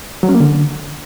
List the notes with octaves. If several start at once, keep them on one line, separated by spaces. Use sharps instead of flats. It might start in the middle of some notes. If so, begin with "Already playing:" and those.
F#3
C#4
A#3
D3